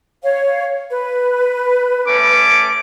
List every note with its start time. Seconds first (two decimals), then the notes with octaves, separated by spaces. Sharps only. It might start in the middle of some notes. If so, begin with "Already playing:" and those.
0.23 C#5 F5
0.90 B4
2.07 A3 C#4 D6